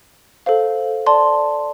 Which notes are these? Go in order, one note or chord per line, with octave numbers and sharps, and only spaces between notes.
A4 C5 F5
D5 A5 C6